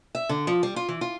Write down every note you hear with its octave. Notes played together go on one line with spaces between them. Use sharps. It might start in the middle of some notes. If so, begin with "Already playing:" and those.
E5
D3
F3
G3
F4
E3
F4